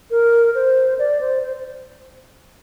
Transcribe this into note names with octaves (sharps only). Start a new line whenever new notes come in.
A#4
C5
D5
C5
C5